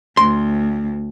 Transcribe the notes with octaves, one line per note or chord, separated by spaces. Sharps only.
D2 C6